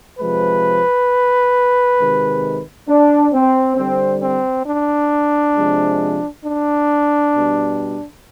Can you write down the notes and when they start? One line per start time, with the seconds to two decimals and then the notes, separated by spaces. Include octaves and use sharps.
0.19 C3 F3 G#3 B4
1.98 C3 D#3 G#3
2.89 D4
3.33 C4
3.77 D3 G3 C4
4.23 C4
4.67 D4
5.57 C3 F3 G#3
6.46 D4
7.35 B2 G3